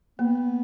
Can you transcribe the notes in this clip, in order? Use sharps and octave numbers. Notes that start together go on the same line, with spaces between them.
A#3 B3